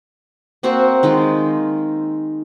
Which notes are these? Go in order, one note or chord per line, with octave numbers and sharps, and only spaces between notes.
A#3 C4 F#4 C5
D#3 G#3 F4